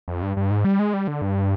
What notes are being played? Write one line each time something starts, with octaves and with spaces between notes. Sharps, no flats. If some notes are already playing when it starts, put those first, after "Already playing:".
F2
G2
G2
G#2
G3
G#3
G3
D3
G2